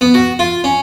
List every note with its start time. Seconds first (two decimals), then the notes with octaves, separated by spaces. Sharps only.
0.01 B3
0.14 F#4
0.39 F4
0.64 C#4